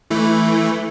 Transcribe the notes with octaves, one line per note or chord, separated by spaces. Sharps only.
E3 A3